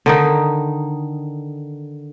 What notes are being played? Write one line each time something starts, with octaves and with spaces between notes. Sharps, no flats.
D3 D#3 D#4